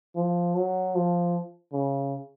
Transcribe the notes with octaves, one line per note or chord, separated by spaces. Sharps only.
F3
F#3
F3
C#3